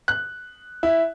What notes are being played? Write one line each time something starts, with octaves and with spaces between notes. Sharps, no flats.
F#6
E4